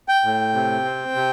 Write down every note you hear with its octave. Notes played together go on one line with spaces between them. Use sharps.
G5
A2
C3
C4
C3